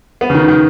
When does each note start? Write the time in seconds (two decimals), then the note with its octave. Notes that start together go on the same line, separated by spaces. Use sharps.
0.21 B3
0.30 C#3
0.34 D#3
0.48 D#3